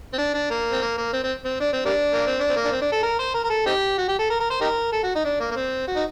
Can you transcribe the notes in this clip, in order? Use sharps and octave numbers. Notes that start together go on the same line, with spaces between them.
C4
D4
D4
A#3
C4
A#3
A#3
C4
C4
C4
D4
C4
G3 A#3 D4
A#3
C4
D4
C4
A#3
D4
C4
D4
A4
A#4
C5
A#4
A#4
A4
C4 D#4 G4
F#4
G4
A4
A#4
A#4
C5
D#4 G4 A#4
A4
F#4
D#4
D4
A#3
A#3
C4
F#4
D#4